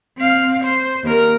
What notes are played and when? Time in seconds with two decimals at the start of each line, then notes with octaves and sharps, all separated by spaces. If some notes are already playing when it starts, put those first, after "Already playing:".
0.17 C4 F5
0.64 C5
1.04 D#2 A#4